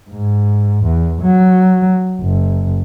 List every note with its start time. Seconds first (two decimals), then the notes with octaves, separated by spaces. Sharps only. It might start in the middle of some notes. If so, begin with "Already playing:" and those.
0.10 G#2
0.85 E2
1.22 F#3
2.21 F#1